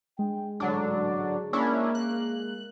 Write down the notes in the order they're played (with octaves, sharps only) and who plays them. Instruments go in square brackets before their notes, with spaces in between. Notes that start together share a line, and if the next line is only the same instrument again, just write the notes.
[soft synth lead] G#3 [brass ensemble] D4 G5
[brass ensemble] A1 G#2 [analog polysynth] D3 F#3 D4
[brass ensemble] A#3 [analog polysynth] C#4 D4 E4
[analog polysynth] F#6